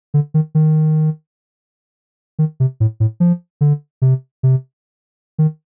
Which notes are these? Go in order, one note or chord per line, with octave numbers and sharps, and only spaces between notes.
D3
D#3
D#3
D#3
C3
A2
A2
F3
D3
C3
C3
D#3